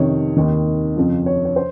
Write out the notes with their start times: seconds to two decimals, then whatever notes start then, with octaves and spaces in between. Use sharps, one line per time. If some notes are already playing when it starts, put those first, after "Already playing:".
Already playing: F2 C3 D#3 C#5
0.37 D#2 D#3
0.96 F2 C#3 F3
1.26 C#5
1.45 C#5
1.56 C5